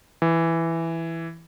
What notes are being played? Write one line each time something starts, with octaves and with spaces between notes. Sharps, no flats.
E3